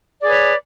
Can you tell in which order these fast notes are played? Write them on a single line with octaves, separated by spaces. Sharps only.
D5 G#4 B4 C#5